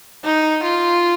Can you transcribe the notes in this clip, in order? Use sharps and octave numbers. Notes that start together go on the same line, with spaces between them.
D#4
F4